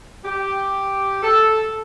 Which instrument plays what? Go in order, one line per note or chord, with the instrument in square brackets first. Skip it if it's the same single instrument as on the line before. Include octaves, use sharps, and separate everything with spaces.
[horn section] G4
A4